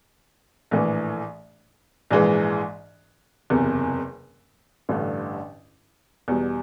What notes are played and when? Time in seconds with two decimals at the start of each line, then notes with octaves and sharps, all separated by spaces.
0.71 A#1 A2 E3
2.10 A#1 G#2 E3 G#3
3.50 F#1 E2 C3
4.89 A1 G2 D3
6.28 E2 B2 G3